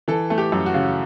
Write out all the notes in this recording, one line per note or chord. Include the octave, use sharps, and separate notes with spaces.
E3 A4
A3
G4
F#2
F#4
C#3